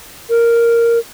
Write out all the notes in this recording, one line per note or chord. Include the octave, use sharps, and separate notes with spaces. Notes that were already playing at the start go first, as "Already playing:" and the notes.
A#4